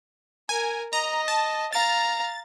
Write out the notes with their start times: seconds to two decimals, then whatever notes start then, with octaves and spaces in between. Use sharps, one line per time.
0.49 A#4 G#5
0.93 D#5 A#5
1.28 A5
1.73 F5 A#5 A6